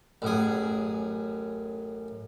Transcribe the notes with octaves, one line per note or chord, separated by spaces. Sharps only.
A1 F#2 G#4